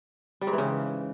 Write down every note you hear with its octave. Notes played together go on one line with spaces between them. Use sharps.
G3
G#2
E3
C#3